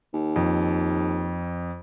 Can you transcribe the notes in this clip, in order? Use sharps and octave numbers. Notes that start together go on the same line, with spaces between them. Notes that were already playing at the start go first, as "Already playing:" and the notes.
D#2
F2